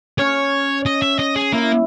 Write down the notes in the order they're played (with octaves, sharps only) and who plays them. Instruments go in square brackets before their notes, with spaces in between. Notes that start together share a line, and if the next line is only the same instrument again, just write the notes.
[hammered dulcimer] C#4 [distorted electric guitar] C#5
[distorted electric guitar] D#5
E5
D#5
G#4
[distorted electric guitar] A#3 [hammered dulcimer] E4